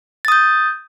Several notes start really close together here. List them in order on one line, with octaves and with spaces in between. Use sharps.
A6 D#6 G6